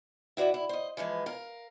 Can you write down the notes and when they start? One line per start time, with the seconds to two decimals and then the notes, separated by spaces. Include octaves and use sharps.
0.37 E4 F#4 C#5 D5 E5
0.54 E4
0.69 C5 D#5
0.97 E3 F3 G#3 B4
1.26 A#4 F5